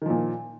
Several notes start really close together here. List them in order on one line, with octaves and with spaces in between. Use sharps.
D#3 F3 A#2